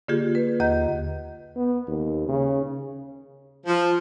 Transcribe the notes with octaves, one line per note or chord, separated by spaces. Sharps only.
D3 A#3 F4 G4 G#4
B4
D#2 D#5 A#5 G6
B3
D#2
C#3
F3